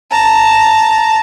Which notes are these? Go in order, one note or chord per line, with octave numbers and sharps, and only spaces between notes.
A5 A#5